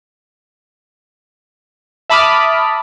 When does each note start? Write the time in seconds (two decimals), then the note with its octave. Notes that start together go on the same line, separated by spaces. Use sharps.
2.10 E5 A5 B5 D6 D#6 F6